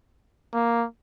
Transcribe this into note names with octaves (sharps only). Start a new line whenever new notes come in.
A#3